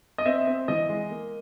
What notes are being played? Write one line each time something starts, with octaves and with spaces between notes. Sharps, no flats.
D#5
C4 E5
C4
E3 D#5
G#3
A#3